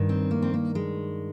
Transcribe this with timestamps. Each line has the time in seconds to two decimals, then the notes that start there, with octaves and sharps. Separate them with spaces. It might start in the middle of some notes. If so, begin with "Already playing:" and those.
Already playing: G2 D#3
0.09 C4
0.31 A#3
0.42 C4
0.54 A#3
0.75 G#3